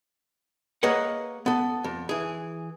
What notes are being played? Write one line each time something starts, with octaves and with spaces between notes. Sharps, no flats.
A#3 G#4 B4 C#5 D#5 F#5
B3 A4
F2
E3 G#4